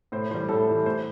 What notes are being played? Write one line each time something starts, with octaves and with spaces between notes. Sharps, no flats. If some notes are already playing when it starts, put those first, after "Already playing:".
A2 C5
E3 G3 C5
A2 A4
E3 G3
A2 C5